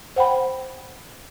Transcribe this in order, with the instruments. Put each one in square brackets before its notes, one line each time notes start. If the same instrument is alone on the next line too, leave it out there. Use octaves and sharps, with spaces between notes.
[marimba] C5 F#5 G5 B5